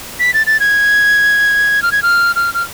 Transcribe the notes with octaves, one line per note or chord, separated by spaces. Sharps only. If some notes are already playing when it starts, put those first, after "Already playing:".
B6
A6
A6
G#6
F6
G#6
F6
F6
F6